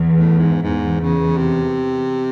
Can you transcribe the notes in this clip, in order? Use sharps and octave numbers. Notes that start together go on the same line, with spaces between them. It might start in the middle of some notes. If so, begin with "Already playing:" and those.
Already playing: E2
A2
G#2
E2 G#2
C#3
C3